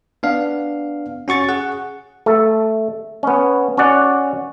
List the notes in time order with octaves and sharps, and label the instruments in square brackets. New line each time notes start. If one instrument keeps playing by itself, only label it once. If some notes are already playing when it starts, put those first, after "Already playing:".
[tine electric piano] B3 D4 F5
C#4 F#4 C#6 A6
G#4 F#5
[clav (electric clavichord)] A3 A4
B3 C#4
C#4 F#4 D5 F#5